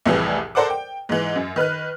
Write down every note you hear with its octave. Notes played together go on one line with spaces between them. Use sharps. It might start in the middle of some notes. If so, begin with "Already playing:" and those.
C2 F2 A2 E3 G3 G#4
A4 A#4 C5 D5 F#5 D6
G5
G#2 E3
F#2
D#3 B4 F6 F#6